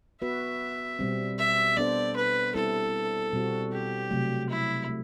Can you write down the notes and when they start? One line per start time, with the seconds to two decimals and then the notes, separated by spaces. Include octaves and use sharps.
0.22 B3 F#4 B4 E5
0.99 B2 G3 C4
1.39 E5
1.77 B3 D4 A4 C5 D5
2.16 B4
2.55 G3 C4 E4 A4 B4
3.33 B2 G3 C4 F#4
3.72 G4
4.11 C3 F#3 A3
4.49 E4
4.88 A3